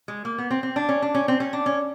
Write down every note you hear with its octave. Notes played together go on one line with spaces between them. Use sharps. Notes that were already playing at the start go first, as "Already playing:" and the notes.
G#3
A#3
B3
C4
C4
D4
C#4
D4
C#4
C4
C#4
D4
C#4